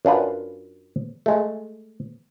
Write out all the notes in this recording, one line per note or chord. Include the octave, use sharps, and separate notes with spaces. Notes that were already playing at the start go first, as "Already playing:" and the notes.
F#2 D4 F4 B4
G#3 A3